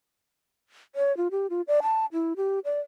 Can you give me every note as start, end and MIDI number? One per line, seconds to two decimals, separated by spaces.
0.95 1.15 73
1.17 1.28 65
1.31 1.47 67
1.50 1.62 65
1.68 1.80 74
1.83 2.06 81
2.13 2.33 64
2.37 2.59 67
2.65 2.80 74